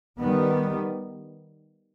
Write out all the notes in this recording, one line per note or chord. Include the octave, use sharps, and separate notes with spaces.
D#3 G3 B3